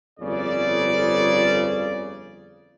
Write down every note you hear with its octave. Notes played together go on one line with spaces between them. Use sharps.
G1 F2 C#3 D5